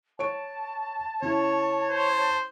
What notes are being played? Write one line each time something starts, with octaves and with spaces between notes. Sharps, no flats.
C#5 A5 C#6 D7
C#3 C#4 E4 C#5
C5 A5